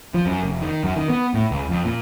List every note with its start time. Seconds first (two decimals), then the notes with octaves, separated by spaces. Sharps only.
0.14 F3
0.26 F#2
0.43 F1
0.61 D#3
0.84 F#2
0.96 D#3
1.10 B3
1.34 A2
1.51 C#2
1.69 F2
1.84 A#2